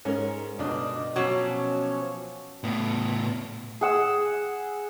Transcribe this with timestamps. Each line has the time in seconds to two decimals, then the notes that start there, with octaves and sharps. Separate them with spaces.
0.05 G#2 C#4 A#4
0.59 G1 B2 D4 F4 D5 D#5
1.16 B2 F3 F#3 C#4 C#5 D6 F#6 G#6
2.64 A2 B3
3.81 G#4 F#5 E6